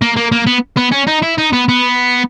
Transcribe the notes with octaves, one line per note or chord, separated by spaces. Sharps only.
A#3
A#3
A#3
B3
B3
C#4
D#4
E4
D#4
B3
B3